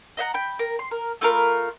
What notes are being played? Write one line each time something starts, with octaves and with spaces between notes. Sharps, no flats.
D#5 E5 F#5 A#5
G5 B5
A#4
C6
A#4
A3 F4 A#4 B5